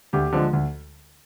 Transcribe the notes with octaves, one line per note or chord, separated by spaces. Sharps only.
D2 G4
D3 F3 G#3
D2